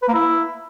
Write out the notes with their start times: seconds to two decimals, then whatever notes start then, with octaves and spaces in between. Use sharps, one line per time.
0.02 B4
0.08 A#3
0.14 E4